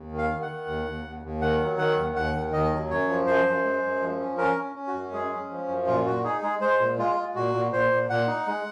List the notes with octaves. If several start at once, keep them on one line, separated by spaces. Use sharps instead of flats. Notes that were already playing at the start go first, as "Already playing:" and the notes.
Already playing: D#2
D#3
F5
D#3
F#5
D#3
D#2
D#2
D#2
D#2
D#3 F#5
F#3
D#3 F#5
D#2
D#2 F#5
D#3
D#2 D#5
F#3
F#2 C#5
F3
F#2 C5
F#2
G#3
F#2
F3
C#4
C#4 A#4
C#4
C#4
F#4
F#2
G#3 G#4
C#4
F3
F#2
A#2 F4
A#2 F#4
D#4 G#4
G#3 G#4
G#3 C5
A#2
G#3 F4
G#3
A#2 F#4
A#2
A#2 C5
A#2
A#2 F#5
D#4
G#3